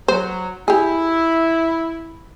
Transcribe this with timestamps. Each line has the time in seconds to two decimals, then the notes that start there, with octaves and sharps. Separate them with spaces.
0.08 F#3 C5
0.68 E4 G4 G#4